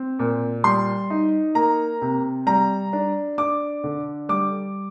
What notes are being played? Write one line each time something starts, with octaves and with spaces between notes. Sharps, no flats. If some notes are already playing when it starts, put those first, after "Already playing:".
Already playing: C4
A#2
G3 C6
D#4
A#3 A#5
C3
G3 A#5
D4
D4 D6
D3
G3 D6